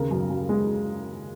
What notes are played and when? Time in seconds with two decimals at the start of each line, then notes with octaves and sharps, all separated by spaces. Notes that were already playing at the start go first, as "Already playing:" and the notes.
Already playing: D#2 C#3 A#4
0.11 F#2
0.30 F#2
0.49 G#3